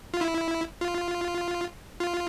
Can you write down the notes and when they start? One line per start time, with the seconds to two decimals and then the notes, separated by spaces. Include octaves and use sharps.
0.14 F4
0.21 E4
0.81 F4
2.00 F4